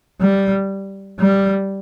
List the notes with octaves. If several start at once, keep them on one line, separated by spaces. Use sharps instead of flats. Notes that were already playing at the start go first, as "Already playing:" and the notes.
G3
G3